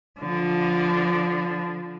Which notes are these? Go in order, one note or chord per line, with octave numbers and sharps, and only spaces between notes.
D3 F3